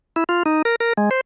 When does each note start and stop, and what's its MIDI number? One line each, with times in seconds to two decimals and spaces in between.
0.16 0.24 64
0.29 0.43 65
0.46 0.62 63
0.65 0.76 70
0.80 0.93 70
0.97 1.10 56
1.11 1.21 72